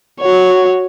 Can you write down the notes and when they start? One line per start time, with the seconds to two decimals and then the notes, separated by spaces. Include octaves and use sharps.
0.20 F#4 C#5